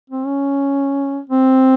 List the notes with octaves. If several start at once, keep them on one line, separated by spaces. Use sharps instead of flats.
C4
C#4
C4